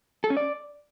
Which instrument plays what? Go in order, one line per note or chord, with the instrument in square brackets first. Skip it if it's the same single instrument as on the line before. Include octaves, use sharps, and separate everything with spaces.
[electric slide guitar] A4
C#4
D5